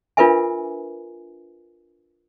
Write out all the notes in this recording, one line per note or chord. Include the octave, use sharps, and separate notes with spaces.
D4 F4 A#4 B4 E5 G#5